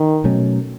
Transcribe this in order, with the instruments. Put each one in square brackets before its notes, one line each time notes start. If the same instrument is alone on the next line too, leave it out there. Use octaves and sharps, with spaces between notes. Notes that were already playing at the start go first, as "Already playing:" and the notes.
Already playing: [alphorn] D#3
[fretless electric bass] B2 F#3 A3 C#4